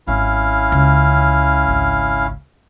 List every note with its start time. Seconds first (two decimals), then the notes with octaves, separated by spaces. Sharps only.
0.08 G#1 C#4 E4 F5
0.72 C#2
1.68 G#1 C#2